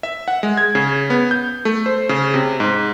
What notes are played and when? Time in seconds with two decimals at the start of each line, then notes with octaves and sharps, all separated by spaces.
0.03 E5
0.28 F#5
0.43 G#3
0.57 G#6
0.75 C#3
1.10 B3
1.31 G6
1.65 A3
1.86 C5
2.09 C#3
2.34 C3
2.60 G#2